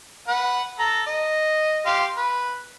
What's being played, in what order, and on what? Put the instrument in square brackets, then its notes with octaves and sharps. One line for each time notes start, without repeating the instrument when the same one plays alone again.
[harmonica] B4 F#5
A4 A#5
D#5
G4 F5 C6
B4